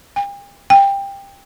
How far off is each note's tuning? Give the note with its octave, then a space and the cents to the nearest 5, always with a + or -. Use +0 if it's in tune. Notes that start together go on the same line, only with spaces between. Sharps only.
G5 +40
G5 +15